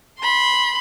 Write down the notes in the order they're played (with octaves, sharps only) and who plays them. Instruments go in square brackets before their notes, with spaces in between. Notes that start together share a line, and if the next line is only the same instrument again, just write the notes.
[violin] B5 C6